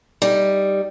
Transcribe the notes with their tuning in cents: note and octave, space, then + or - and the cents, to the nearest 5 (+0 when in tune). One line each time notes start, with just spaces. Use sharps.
G3 +0 D#4 +0